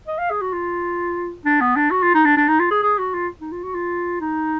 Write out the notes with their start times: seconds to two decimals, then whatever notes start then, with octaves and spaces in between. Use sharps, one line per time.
0.07 D#5
0.18 F5
0.30 G#4
0.41 F#4
0.53 F4
1.45 D4
1.61 B3
1.76 D4
1.90 F#4
2.02 F4
2.14 D#4
2.25 D4
2.37 D4
2.48 D#4
2.60 F4
2.71 G#4
2.83 G#4
2.98 F#4
3.14 F4
3.40 D#4
3.52 F4
3.63 F#4
3.74 F4
4.21 D#4